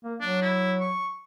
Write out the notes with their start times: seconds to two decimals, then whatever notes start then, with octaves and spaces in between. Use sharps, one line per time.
0.04 A#3
0.21 F#3 D4
0.42 E4
0.80 C#6